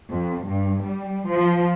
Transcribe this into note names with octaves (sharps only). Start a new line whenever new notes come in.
F2
G2
G3
F3